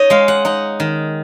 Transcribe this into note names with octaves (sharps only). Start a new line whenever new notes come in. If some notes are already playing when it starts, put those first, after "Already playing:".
Already playing: D#4 C#5 D#5
G#3 F5
F#5
D#4 F#5
D#3